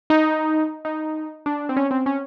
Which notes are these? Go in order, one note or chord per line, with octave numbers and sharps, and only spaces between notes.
D#4
D#4
D4
C4
C#4
C4
C#4